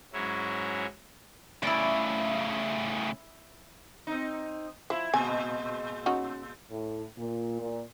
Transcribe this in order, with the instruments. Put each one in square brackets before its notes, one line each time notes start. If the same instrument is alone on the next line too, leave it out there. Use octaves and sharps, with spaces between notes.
[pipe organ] G#2 F#3 C#4 E4
[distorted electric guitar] A2 C#3 [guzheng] E4 D5
[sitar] C4 D#4
[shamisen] F3 [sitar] E4
[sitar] A#2 G#3 [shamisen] G#5
[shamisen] C#4 D#4 F#4
[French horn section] A2
A#2
A#2